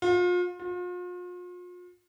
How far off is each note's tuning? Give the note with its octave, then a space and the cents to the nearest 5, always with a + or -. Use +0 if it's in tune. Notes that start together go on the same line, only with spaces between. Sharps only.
F4 +35
F4 +40